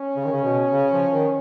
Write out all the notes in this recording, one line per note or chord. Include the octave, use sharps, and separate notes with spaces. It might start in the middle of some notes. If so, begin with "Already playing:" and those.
Already playing: C#4
C#3
D#3
C#3
B2
C#3
F3
D#3